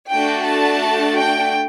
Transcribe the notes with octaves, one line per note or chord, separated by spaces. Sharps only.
A3 D4 F#4 A4 G5
A5
G5